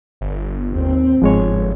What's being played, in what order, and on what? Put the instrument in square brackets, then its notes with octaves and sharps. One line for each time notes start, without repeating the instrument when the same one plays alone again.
[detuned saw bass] G1
[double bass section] D#2 C4
[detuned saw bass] G1 [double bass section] G#2 [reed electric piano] F3 G#3 C#5